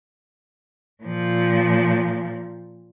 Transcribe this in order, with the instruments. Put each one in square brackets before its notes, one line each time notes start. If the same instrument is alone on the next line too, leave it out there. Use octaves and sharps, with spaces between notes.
[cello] A#2 F3